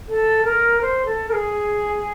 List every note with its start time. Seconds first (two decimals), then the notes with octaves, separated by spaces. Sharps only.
0.09 A4
0.45 A#4
0.82 C5
1.05 A4
1.29 A#4
1.33 G#4